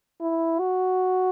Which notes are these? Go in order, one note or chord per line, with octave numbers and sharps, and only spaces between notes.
E4
F#4